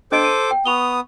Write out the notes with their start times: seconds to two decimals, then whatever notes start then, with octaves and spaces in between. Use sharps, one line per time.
0.12 D4 A4 C5 D#5 D6 D7
0.24 D#7
0.51 G5
0.66 B3 C#6 D#6 F7 G7